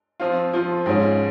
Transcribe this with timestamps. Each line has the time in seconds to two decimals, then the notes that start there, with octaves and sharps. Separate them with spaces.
0.20 F3 C4 F4
0.53 F3 C4 F4
0.86 G#2 F3 G#3 C#4